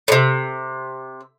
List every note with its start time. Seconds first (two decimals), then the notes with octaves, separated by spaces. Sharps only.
0.08 A2 C3